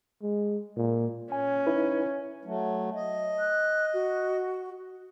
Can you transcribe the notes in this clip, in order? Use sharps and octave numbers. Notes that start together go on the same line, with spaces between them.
G#3
A#2
C#4 G#5
D#4 E4 B4
F#3 A3
D#5
F#6
F#4